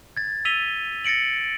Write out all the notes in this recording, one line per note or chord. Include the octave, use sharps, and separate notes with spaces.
G#6 A6
E6 B6 D#7 F7 G7
A6 A#6 C#7 D7 F#7